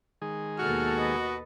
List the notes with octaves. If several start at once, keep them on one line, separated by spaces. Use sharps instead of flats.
D#3 G#3 G#4
D#2 B2 F#4 A4 F6
B4 D#5